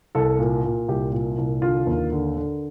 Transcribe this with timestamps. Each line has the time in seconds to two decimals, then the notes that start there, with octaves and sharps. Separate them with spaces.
0.15 C2 A4
0.39 A#2
0.64 A#2
0.88 C2 G4
1.13 A#2
1.38 C2
1.62 D3 F4
1.87 D#2
2.12 D3
2.36 D3